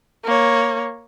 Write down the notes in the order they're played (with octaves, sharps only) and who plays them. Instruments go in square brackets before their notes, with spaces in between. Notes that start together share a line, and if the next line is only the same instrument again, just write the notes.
[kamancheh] A#3 C#5